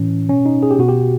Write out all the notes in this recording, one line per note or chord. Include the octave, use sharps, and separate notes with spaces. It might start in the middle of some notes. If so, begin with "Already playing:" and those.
Already playing: A2 E3 C#4
B2 C#4
D#4
G#4
G4
B2 F#4
G4